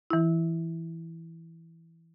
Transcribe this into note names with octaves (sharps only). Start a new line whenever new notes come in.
E3 E4